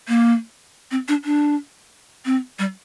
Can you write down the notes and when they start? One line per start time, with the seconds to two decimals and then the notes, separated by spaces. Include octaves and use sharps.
0.08 A#3
0.91 C4
1.08 D4
1.25 D4
2.25 C4
2.59 G3